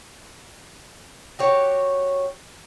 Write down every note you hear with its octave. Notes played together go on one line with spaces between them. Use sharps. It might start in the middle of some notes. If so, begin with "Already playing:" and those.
F#4 G4 C#5